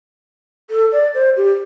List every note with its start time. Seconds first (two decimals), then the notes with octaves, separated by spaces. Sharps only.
0.70 A4
0.92 D5
1.15 C5
1.37 G4